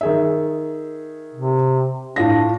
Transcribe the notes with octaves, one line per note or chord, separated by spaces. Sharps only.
D#3 G#4 E5
C3
A2 D4 F4 A#6